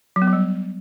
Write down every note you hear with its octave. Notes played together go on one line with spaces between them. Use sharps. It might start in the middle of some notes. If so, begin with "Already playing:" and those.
F#3
B3
F#3
G3